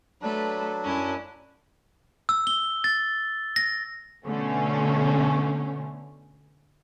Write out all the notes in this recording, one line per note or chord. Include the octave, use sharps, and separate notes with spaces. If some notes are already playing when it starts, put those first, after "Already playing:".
F#3 A3 D4 A4 B4
F#2 C#4 E4
E6
G7
A6
A#6
B2 D3 A3 C#4